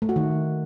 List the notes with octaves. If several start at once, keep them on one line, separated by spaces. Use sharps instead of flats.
A3
F#4
D#3